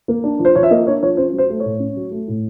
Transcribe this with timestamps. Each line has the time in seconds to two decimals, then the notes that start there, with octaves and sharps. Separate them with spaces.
0.08 A#3
0.24 D4
0.39 F3
0.45 C5
0.55 F3 C#5
0.63 E5
0.71 A#3 D#5
0.87 D4 C#5
1.02 F3 C#5
1.17 C#4 C5
1.33 F#3
1.38 C5
1.49 A3
1.60 A2 C#5
1.80 C#4
1.96 F#3
2.11 A3
2.28 A2